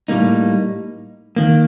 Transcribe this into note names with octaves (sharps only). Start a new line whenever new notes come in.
A2 G3 A#3 D#4
D#2 D#3 A#3